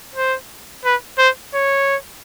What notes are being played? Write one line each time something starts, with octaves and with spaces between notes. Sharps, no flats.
C5
B4
C5
C#5